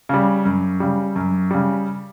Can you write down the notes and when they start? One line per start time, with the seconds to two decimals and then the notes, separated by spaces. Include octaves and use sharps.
0.09 C#3 G3
0.45 F#2
0.80 C#3 G3
1.16 F#2
1.51 C#3 G3